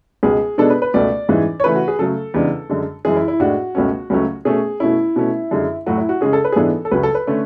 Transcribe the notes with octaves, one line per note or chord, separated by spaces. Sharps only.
C#2 B2 G#3 G#4
B2 G#3 B3 D4 A4
B4
B4
C#2 B2 A3 D5
G#2 E3 G#3 C#4
C#5
C#3 E3 A3 C#4 B4
F#4
G#4
C#3 F#3 A3 A4
E2 C#3 G#3 D4
F#2 D3 G#3
F#2 E3 G#3 G#4
E4
E4
A2 G#3 D4 F#4
C#2 B2 A3 C#4
C#2 C#3 F#3 A3 C#4
B2 A3 C#4 G#4
B2 A3 C#4 E4
B2 A3 C#4
F#2 D3 G#3
A2 F#3 A3 F#4
E4
F#4
C#3 G#3 C#4 G#4
A4
B4
G#4
G#2 E3 G#3 B3 D4 A4
A4
C#2 C#3 F#3 C#4 B4
A4
B4
D3 A3 C#4